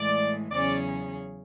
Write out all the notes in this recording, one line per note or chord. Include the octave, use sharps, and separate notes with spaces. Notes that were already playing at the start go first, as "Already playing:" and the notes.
Already playing: A2 E3 G#3 D5
E2 C#3 F#3 C#4 G#4 D5